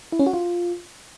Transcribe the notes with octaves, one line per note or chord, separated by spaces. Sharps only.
E4
C#4
F#4
F4